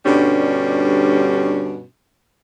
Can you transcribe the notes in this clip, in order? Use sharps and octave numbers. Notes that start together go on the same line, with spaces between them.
G2 B2 D3 G3 C#4 D4